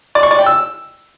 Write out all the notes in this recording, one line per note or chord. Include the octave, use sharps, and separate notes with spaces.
D5
C#6
D5
G5
E6